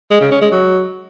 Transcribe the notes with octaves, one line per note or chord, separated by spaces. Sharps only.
G#3
C#3
C#4
G#3
F#3